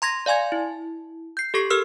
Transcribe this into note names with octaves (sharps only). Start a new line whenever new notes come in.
A#5 C6 G#6 A#6
D5 F5 G#5 C6 G#6
E4
G6 C7
G4 A4 C#6 C7
G4 A#4 E6 F6